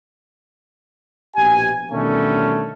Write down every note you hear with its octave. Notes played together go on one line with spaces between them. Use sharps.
A#1 B2 G4 G#5
B2 D3 D#3 G3 A3 C#4